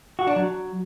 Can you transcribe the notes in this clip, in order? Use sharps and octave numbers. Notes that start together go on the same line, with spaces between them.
F#4
D4
F#3